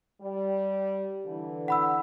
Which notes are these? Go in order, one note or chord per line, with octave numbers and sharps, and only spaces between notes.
G3
D3 E3
F#5 B5 E6